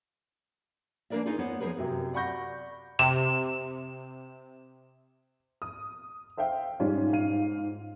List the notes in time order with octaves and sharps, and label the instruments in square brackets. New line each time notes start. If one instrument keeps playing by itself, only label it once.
[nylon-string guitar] E3 A#3 D4 A#4 D5 E5
D#4 F4 G#4
B3 C5 C#5
F3 G#3 A3 G#4 A#4 B4
[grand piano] F#2 C3
D5 F#5 B5 C#6 G6 A#6
[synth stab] C3 [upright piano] E7
[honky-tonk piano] D#6
C5 E5 F5 G5
G#2 G3 C#4 F4
G#2 F5 D#7